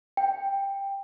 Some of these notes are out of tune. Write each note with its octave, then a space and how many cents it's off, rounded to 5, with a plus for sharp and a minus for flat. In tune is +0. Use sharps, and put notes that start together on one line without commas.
G5 +10